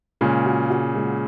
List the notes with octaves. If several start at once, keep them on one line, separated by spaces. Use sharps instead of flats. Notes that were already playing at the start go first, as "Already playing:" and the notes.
A#2 C#3 G#3
F#4
F#4
G#3